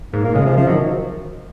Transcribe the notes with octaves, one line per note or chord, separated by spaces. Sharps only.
G#2 A#3
A#2 A#3
C#3 G#3
C3 F3
C#3 F3
D#3 F#3